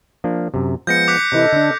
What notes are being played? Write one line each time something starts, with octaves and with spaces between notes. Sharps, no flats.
F3 A#3 D4
F#2 C3
F3 G#3 B3 G6 A#6 C#7
D6 F#6 B6
C3 E3 E4 A4 D#5
D3 D4